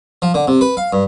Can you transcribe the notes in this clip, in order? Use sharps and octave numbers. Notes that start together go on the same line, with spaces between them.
F3
D3
C3
B4
F5
G2